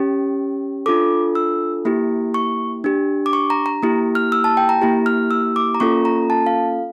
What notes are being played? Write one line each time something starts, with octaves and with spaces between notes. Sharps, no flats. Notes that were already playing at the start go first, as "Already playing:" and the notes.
Already playing: C#4 G4
D4 F4 A4 D6
E6
A#3 E4 G4
C#6
D4 G4
D6
C#6
A#5
A#5
A#3 E4 G4
F6
E6
A5
G5
A#5
A#3 E4 G4
F6
E6
D6
A#5
A#3 C#4 F4 A4 C#6
A#5
A5
F5